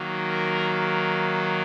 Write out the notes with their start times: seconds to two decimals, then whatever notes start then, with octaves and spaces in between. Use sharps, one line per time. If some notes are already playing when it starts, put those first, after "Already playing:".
Already playing: D#3 F#3 A#3
0.28 A#4